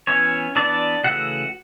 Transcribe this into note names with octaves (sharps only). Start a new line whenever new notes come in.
E3 B3 C#4 C#5
E3 B3 D4 D5
C#3 E3 A3 F#4 F#5